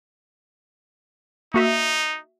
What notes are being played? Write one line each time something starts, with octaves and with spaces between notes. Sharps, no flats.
A#3 D#4 F#4 E5